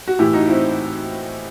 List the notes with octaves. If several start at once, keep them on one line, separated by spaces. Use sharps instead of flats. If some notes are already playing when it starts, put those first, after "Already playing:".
F#4
A2 E3 E4 G4
D#4 F#4
C4 E4